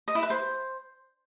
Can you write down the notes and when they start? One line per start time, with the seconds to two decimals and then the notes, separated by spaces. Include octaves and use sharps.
0.08 D#5
0.15 E4
0.23 B4
0.30 C5